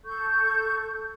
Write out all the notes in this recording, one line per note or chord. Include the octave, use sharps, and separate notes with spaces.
A4 C#6 G6